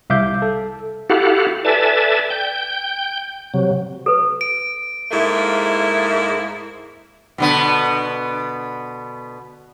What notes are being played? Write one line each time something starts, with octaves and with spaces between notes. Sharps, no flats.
C2 E5 F5 D6 G6
A4
E4 F#4 G4 A4 F5 F#5
A4 B4 D5 E5 G#5 A5
G5 G6
C3 F#3
A4 B4
D7
G#2 A3 A#3 E4
B2 D3 B3